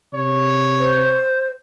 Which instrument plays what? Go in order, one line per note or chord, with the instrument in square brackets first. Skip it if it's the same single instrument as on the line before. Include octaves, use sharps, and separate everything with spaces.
[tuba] C3 [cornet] C#5
[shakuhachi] C5